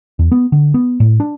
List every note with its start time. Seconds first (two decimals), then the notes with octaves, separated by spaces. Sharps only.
0.19 E2
0.32 B3
0.52 D3
0.74 B3
1.00 A2
1.20 D4